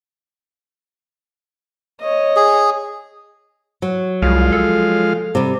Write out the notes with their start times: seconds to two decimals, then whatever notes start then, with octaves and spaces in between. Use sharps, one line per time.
2.00 C#5 D#5
2.36 G#4
3.82 F#3
4.22 C2 F3 G#3 F5
4.52 A4
5.35 C3 G3